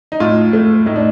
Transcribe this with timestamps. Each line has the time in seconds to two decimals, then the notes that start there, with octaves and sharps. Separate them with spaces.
0.12 D#4
0.20 A2 F4
0.53 A3
0.86 A2 D#4
0.96 D4